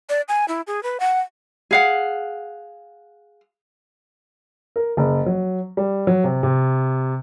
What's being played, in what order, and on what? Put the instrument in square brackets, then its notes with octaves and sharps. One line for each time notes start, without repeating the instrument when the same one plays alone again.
[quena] D5
G#5
E4
G#4
B4
F#5
[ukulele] G#4 F5 F#5
[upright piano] A#4
F#1
F#3
G3
F#3
C3
C3